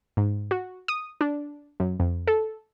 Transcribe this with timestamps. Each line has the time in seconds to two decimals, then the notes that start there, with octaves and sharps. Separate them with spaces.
0.17 G#2
0.51 F#4
0.88 D#6
1.21 D4
1.80 F#2
2.00 F2
2.27 A4